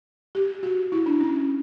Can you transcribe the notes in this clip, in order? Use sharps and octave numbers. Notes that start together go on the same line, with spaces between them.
G4
F#4
E4
D4
C#4